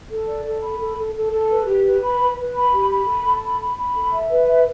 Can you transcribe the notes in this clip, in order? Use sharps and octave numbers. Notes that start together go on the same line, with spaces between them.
A4
D5
A4
B5
A4
A4
A4
A4
B4
G4
B4
B5
B4
B4
B5
G4
B5
A4
A4
B5
B5
B5
A4
E5
B4
E5